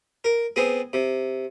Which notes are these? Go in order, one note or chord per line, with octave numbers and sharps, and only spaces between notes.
A#4
B3 C4 G#4
C3